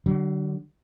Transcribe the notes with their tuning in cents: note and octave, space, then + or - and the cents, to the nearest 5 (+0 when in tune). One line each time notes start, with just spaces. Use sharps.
D3 +15 F#3 +45